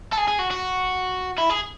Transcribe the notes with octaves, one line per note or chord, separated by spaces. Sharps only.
A4
G#4
G#4
F#4
F#4
E4
G#4